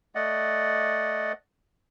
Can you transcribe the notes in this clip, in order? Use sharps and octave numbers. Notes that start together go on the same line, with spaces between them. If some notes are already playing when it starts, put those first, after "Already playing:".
A3 D5 D#5 F#5